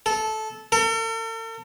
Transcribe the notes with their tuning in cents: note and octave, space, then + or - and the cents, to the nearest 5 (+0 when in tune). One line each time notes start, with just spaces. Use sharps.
A4 -15
A4 +45